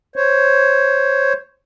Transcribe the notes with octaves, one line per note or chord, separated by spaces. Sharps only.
C5 C#5